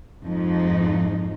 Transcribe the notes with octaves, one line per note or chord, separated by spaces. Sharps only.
F2 G#2 F3 D#4